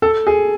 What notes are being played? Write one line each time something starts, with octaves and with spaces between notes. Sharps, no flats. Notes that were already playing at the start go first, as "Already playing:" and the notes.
A4
G#4